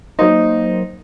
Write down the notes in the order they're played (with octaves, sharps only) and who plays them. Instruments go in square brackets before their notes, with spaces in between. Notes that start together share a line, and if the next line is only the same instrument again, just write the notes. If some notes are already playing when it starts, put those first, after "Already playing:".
[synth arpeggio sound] F#3 A#3 C5 [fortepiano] D#4